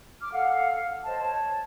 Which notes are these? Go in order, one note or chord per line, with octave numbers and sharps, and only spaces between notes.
D6 F6
A4 F5 F#5
C5 C#5 D#5 A5
C#5 A5